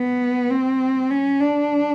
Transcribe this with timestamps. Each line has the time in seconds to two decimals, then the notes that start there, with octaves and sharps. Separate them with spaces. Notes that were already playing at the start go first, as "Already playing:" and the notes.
Already playing: B3
0.51 C4
1.11 C#4
1.41 D4